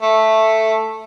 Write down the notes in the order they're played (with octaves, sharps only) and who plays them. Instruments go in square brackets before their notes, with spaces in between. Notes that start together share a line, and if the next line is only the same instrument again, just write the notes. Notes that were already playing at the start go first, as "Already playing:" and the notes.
[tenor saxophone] A3